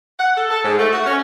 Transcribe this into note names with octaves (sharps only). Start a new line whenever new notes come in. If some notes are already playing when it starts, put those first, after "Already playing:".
F#5
A4
A4
G#2
A3
F#4
C#4